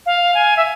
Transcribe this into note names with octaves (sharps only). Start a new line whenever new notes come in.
F5
G#5
E5